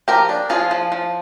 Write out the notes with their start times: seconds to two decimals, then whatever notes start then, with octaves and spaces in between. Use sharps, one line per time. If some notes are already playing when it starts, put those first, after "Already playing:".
0.08 F3 G4 A#4
0.29 D4
0.49 F3 F4 G#4
0.71 F3
0.92 F3